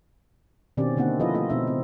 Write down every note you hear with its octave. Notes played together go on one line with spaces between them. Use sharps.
B2 D#3 C4 C#4 G4 D5
D3 A#3 C4 D#4 F#5
F3 E4 F4 A4 B4 D#5
A3 F4 D#5
B2 C4 D#4 E5
C#3 C4